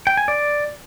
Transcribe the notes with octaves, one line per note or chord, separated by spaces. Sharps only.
G5
G#5
D5